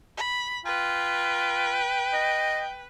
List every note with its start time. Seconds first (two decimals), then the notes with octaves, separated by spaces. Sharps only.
0.17 B5
0.66 F4 B4 G5
2.13 D#5